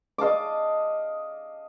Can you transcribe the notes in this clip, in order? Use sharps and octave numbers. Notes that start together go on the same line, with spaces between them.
D#5 F5 A5 D6